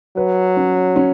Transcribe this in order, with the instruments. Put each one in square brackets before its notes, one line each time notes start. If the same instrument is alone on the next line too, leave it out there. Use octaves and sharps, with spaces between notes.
[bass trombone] F#3 [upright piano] B4
[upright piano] C#4
C#4